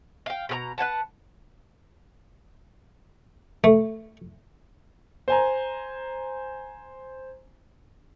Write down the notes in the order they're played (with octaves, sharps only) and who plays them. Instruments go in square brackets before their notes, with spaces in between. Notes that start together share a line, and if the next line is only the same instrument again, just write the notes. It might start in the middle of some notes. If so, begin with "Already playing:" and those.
[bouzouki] F5 G5
B2 G#4 A#5
B4 C#5 F#5 A5
[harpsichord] A3
[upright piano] C5 G#5 A#5